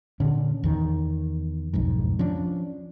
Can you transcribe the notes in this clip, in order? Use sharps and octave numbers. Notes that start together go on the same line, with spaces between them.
A#2 D3 C#4
E2 D#3
B1 F2 G#2
F3 C#4 D4